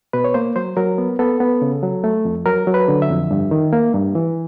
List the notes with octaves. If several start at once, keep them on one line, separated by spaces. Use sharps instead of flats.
B2 B4
C#5
A#3 C5
F#3 C5
F#3 A#4
B3
B3 A4
B3
C#3
F#3
A3
F2
F#3 A#4
F#3
B4
D3
E5
F2
G2
D#3
A#3
G2
E3